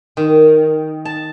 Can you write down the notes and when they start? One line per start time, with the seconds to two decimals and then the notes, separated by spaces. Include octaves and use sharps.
0.17 D#3
1.05 A5